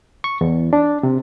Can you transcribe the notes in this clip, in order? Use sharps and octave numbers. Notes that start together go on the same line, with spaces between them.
C#6
E2
D4
C3